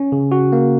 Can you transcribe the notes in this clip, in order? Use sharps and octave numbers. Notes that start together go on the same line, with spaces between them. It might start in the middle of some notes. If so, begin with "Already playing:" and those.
Already playing: C#4
C#3
F#4
A#3